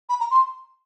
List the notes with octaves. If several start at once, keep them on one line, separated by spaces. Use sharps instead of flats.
B5
A#5
C6